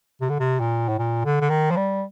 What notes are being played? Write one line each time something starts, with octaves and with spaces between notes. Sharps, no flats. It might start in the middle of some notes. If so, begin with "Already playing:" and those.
C3
D3
C3
A#2
A2
A#2
D3
D3
D#3
F3
G3